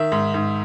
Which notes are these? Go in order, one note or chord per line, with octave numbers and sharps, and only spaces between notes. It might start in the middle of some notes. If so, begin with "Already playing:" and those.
Already playing: D#3 E5
G#2
G#2